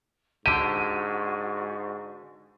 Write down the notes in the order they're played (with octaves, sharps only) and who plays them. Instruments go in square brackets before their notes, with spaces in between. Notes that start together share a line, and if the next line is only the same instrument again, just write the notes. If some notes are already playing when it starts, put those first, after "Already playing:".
[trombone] G#2 [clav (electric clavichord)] D3 G4 [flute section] F#4 D5 C#6 [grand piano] D#7